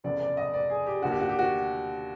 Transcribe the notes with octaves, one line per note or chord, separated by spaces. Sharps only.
F1 E2 C#3 D5
D5
D#5
D5
G#4
G4
D#2 D3 F#4
G4
F#4
G4
F#4